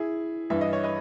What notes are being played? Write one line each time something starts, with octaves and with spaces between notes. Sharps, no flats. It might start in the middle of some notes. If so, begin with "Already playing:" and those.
Already playing: E4 G#4
G2 E3 E5
D#5
C#5
B4 D#5